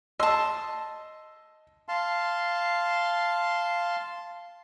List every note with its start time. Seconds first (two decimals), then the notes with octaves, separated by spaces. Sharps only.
0.20 D#5 A5 C6 E6
1.88 F5 A5 C6